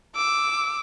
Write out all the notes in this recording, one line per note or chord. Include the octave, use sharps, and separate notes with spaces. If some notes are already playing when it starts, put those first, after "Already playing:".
D6 E6